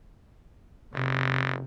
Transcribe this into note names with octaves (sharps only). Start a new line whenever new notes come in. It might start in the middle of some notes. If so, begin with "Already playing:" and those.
F#1 C3